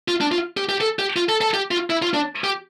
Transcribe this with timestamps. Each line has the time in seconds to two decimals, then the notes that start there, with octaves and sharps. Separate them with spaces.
0.08 F4
0.21 D4
0.32 F4
0.57 G4
0.69 G4
0.81 A4
0.99 G4
1.16 F4
1.29 A4
1.41 A4
1.54 G4
1.71 F4
1.90 E4
2.02 F4
2.14 D4
2.44 G4